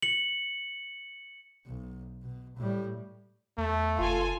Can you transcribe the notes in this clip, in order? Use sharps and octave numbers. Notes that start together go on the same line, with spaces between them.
C#7 F#7
B1
B2
A2 G3
E2 A3
F#1 F4 A4 G#5